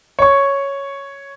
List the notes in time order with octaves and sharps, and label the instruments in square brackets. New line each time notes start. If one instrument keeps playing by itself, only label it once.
[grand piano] C#5 C#6